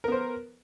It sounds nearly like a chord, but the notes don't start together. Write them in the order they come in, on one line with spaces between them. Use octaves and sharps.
A#4 B3 C5